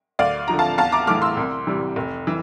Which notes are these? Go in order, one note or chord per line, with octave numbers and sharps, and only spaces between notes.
D2 D5 F5
D3 F3 A#5
F5 A5
E2 F5 A5
A#5 D6
E3 A3 D6 F6
C6 E6
C2
C3 E3 G3
F1
E3